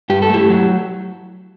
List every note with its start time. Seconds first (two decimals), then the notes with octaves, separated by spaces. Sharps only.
0.10 G2 G4
0.22 A4
0.30 A3 E4 G4
0.50 F#3